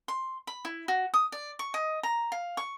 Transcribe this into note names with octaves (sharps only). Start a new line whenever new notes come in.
C6
B5
E4
F#4
D#6
D5
C#6
D#5
A#5
F5
C#6